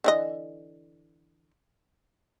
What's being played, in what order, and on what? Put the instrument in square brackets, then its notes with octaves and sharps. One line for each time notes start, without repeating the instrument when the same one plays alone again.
[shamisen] D3 E3 D#5